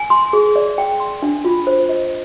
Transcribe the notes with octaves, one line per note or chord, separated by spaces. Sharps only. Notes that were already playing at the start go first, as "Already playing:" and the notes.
Already playing: G#5
C6
G#4
D5
G5
C6
D4
F4
C5
D#5